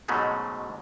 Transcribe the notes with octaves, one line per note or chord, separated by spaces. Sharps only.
G#2 B2 F#3 G#3 A3 C#4